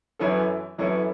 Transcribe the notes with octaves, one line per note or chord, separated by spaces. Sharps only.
F#2 E3 C#4 E4 A4
F#2 E3 C#4 E4 A4